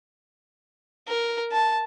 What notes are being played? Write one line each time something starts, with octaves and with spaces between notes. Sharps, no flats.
A#4
A5